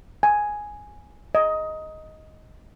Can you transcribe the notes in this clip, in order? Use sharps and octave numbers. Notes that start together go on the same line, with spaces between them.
G#5
D#5